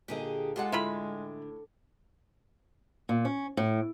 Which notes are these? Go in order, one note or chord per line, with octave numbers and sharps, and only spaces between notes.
A#2 D3 G4 G#4 D#5
G#3 F4 G4 A4 F#5
A2 D3 E4 F4 B5
A#2
C#4
A2